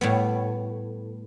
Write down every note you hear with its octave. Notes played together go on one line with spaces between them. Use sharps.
A2 G3 B3